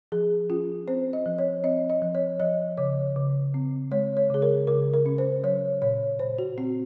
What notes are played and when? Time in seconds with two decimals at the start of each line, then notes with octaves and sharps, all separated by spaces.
0.12 F3 G#4
0.50 C#4 F4
0.88 C4 C5
1.13 D#5
1.26 F3
1.38 C#5
1.64 C4 D#5
1.90 D#5
2.02 F3
2.15 C#5
2.40 F3 D#5
2.77 C#3 C#5
3.16 C#3
3.54 C4
3.91 G#3 C#5
4.17 C#5
4.30 C#3 G#4
4.42 A#4
4.67 C#3 A#4
4.94 A#4
5.06 C#4
5.18 C5
5.44 F#3 C#5
5.82 A#2 C#5
6.19 A#2 C5
6.39 F#4
6.58 C4 F#4